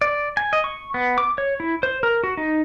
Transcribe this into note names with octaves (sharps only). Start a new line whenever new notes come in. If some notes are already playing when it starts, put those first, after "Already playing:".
D5
G#5
D#5
C#6
B3
D6
C#5
E4
C5
A#4
F#4
D#4